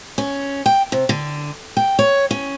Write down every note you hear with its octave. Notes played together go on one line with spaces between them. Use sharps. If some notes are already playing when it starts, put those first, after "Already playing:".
C#4
G5
C3
D3
G5
C#5
C#4